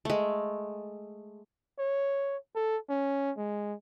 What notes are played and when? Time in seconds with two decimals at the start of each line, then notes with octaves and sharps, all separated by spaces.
0.05 G#3 A3
1.79 C#5
2.55 A4
2.89 C#4
3.37 G#3